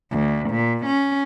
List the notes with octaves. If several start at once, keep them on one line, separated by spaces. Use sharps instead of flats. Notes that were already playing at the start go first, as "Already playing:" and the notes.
D2
A#2
C#4